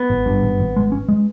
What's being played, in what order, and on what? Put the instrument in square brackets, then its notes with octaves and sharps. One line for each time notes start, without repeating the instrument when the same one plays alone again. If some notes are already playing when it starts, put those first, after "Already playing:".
Already playing: [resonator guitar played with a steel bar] B3
[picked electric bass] G#1
G2
G#1
G#1
G#3
C#4
G#3